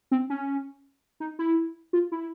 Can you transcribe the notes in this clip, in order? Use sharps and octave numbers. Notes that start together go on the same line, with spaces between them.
C4
C#4
D#4
E4
F4
E4